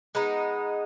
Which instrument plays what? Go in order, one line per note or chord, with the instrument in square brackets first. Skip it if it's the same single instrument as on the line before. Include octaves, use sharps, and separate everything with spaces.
[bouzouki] G#3 B3 D#4